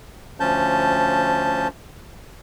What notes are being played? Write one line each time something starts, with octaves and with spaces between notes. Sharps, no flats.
D2 F3 C#4 A5 G6